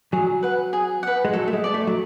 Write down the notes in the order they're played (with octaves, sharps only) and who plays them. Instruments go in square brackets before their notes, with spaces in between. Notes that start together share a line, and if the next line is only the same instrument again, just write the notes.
[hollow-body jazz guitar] F#3 [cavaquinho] G#4
[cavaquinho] B4 F#5
G#4
B4 F#5
[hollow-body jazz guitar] G#3
[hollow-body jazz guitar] F#3 [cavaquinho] A4
[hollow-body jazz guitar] A3
G#3
[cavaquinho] D5 A5
[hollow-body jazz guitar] A3
F#3